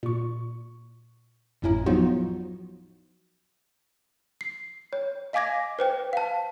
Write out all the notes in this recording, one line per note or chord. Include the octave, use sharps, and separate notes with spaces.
A#2 C#6
G#1 F2 A2 C#4 E4 A#5
F3 F#3 B3 D#4 F4 F#4
C7
C#5
D#5 F5 G#5 D6 G#6 A#6
B4 C5 G5
F5 A5